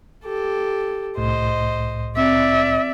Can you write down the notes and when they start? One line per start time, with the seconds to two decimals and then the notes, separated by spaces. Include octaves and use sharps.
0.24 G4 A4
1.18 C2 A2 C5 D#5
2.17 C4 D5 E5